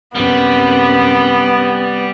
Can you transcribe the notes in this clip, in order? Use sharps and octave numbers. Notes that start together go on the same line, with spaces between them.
F#2 C3 G3 B3